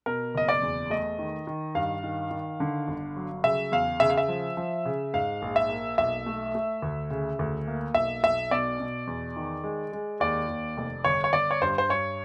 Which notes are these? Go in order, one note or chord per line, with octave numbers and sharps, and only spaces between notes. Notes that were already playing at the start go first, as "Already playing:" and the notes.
B2 A#4
F#1 D#5
D5
E2
A3 D#5
D#3
D#3
G2 F5
D#3
D#3
D3
G1
F#3
C#3 E5
E2 F5
C#3 E5
F5
E5
F3
F3
C#3
G#2 F5
A#1
E5
A#3
B1 E5
A3
A3
D2
C#3
D2
A#3
B1 E5
B1 E5
B2 D5
B2
E2
D#3
G#3
G#3
D#2 D5
D#2
F1
G1 C#5
C#5
G1 D5
C#5
G2 C5
C5
G2 C#5